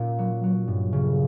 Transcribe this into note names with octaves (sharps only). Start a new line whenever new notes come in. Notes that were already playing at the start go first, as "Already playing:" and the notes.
Already playing: A#2 C#4
F#3
F#3
G2
C#3